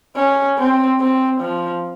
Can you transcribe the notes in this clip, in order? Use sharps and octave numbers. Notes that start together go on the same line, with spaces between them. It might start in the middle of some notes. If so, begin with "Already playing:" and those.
C#4
C4
C4
F3